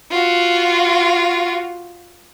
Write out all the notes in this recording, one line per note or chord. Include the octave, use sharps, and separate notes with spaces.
F4 F#4